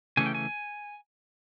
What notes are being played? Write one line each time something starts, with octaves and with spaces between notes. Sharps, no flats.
C#3 E3 A3 C#4 G#5
G5
G#5